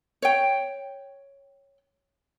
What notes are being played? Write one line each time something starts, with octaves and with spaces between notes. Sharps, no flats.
C#5 G5